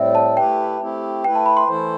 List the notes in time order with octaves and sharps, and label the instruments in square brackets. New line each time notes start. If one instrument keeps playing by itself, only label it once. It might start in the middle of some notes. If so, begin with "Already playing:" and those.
Already playing: [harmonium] A2 G3 C4 [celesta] E5
[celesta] A5
[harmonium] A3 E4 G4 B4 [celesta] G5
[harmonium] A3 C4 E4 G4
[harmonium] A3 E4 B4 [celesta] G5
[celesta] A5
B5
C6
[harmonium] E3 A3 E4 A4 C5